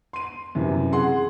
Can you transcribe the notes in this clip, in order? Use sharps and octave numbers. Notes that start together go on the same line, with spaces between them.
C6 D#7
F#2 C3 E3
G#4 F#5 C6